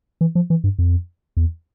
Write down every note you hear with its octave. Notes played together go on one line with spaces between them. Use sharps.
E3
F3
E3
G2
F2
E2